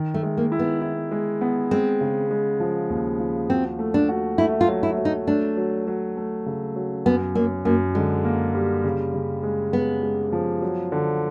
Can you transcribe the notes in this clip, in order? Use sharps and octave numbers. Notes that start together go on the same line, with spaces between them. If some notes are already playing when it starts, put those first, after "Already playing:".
Already playing: D#3
A3
G#3
A#3
E4
B3
E4
G#3
B3
G#3 C4
C#3
G#3
F3
D#2
F3
C4 F#4
A3
D4
F#4
A3 E4
F4
F#3
E4
F#3
D#4
A3 D4
F#3
F#3
A3
C#3
F#3
F#2 B3
F#2 A#3
F#2 A#3
D3 G#3
A#3
G3
C#3
C#3
G#3
G#3 B3
G#3
F3
F#3
D3